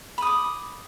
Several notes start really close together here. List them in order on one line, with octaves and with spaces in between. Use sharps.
B5 D#6 D6